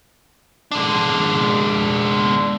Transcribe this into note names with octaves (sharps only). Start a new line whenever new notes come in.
G#3 D4